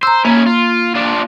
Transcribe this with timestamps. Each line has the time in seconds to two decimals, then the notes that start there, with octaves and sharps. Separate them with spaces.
0.03 C5 A#5 E6
0.25 A#3 C#4 E4
0.46 F4
0.95 D4 F4